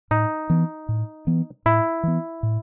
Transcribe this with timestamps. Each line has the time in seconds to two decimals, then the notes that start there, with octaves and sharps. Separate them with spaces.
0.11 A2 D#4
0.50 E3 B3
0.89 A2
1.27 E3 B3
1.66 A2 E4
2.03 E3 B3
2.43 A2